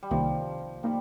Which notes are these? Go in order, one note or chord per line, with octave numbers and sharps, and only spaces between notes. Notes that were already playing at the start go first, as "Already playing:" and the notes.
G3
C2 C3 D#3 F3 A#3
D#3 G3 A#3